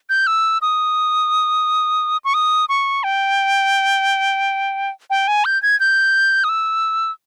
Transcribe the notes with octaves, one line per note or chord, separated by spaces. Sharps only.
G6
E6
D#6
C#6
D#6
C#6
G5
G5
G#5
G6
G#6
G6
D#6
E6